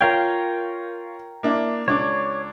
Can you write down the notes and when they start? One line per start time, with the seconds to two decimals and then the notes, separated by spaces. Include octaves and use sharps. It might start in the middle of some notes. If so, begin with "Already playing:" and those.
0.01 F4 A#4 C#5 F5 G5 G#6
1.43 A#3 D4 E4
1.88 C#2 D4 C#5 D6